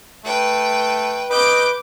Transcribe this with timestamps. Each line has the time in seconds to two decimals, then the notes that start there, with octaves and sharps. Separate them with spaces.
0.24 A3 B4 G5
1.30 B4 D#5 D6 G6